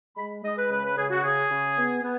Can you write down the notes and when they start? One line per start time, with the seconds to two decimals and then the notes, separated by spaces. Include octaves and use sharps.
0.17 G#3 B5
0.43 G#3 D#5
0.58 B4
0.70 C#3 B4
0.84 B4
0.97 C#3 G#4
1.10 F#4
1.24 C#3 G#4
1.50 C#3
1.77 B3
2.03 B3